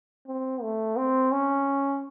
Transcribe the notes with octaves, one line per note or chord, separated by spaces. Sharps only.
C4
A3
C4
C#4